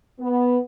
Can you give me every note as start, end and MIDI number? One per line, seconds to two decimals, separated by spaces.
0.20 0.58 59